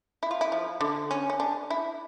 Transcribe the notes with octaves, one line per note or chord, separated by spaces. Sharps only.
E4
F4
E4
F3
D3
C#4
C#4
D4
E4